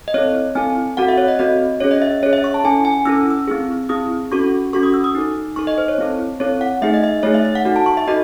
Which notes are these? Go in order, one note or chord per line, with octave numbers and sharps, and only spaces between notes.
D#5
C4 E4 A4 C#5
C4 E4 A4 G#5
C4 F#4 A4 F#5
E5
C#5
D#5
C4 F#4 A4 D#5
C#4 G#4 C#5
D#5
E5
C#4 G#4 C#5
E5
C#6
A5
C#4 E4 A4 G#5
G#5
C#4 E4 A4 E6
E6
C4 E4 G#4
C4 E4 G#4 D#6
C#4 F#4 A4 C#6
C#4 F#4 A4 C#6
D#6
E6
D#6
D#4 A4
D#4 A4 C#6
D#5
C5
C#5
C4 E4 A4
C4 E4 A4 C#5
F#5
A3 D#4 G#4 E5
D#5
E5
A3 D#4 G#4 C#5
E5
E5
F#5
D#4 F#4 A4
A5
C#6
E5
D#4 F#4 A4 D#5